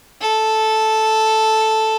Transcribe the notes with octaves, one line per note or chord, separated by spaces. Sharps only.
A4